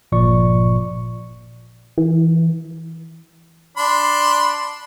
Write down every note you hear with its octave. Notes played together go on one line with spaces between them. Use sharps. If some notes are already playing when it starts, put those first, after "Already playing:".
G1 A#2 F3 D5 C#6
E3
D4 B5 C6